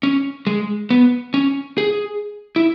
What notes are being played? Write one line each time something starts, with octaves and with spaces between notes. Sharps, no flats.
C#4
G#3
B3
C#4
G#4
E4